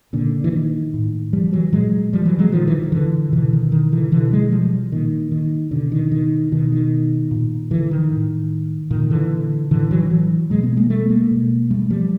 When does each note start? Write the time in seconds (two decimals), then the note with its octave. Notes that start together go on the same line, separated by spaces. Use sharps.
0.13 A#2 D3
0.44 E3
0.52 D#3
0.94 A2
1.33 F3 G3
1.53 E3 F#3
1.72 A#2 F#3 G#3
2.13 F3 G3
2.26 E3 F#3
2.39 F#3 G#3
2.52 A#2 D#3 F3
2.68 E3
2.73 D#3
2.83 F3
2.92 D3 E3
3.32 B2 D3 E3
3.53 D#3
3.72 D#3
3.92 D3 E3
4.12 B2 D3 E3
4.32 F#3 G#3
4.43 F#3
4.52 F3 G3
4.92 A#2 D#3
5.31 D#3
5.71 B2 D3
5.92 D#3
6.12 D#3
6.52 B2 D#3
6.72 D#3
7.31 A#2
7.71 D3 E3
7.91 D#3
8.12 A2
8.90 A#2 D#3
9.10 D3 E3
9.71 A2 D3 E3
9.91 E3 F#3
10.10 E3 F#3
10.50 B2 F#3 G#3
10.63 A3 B3
10.77 G#3 A#3
10.90 G3 A3
11.10 G#3 A#3
11.31 B2
11.71 G3 A3
11.90 F3 G3